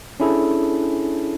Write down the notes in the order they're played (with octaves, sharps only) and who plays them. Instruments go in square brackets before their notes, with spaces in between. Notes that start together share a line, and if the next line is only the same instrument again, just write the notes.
[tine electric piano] C#4 D4 E4 G#4 A4